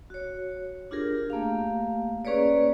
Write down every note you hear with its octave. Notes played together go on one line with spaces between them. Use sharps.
F#4 C#5
D4 F4 G4 G#4 A#4
A3 A#3 G4 F5
A#3 C#4 G#4 B4 C#5 D5